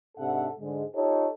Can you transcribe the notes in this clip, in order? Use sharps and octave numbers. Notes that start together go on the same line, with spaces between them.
G#2 C3 D4 A4 E5 F#5
G#2 D3 G#3
D#4 F4 G4 A4 C#5